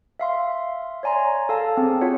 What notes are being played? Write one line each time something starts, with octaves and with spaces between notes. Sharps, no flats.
E5 F5 C6
C#5 D5 G#5 A#5 C6
A4 F5 A5
C4 G#4
F4 F#4 C#5 F#5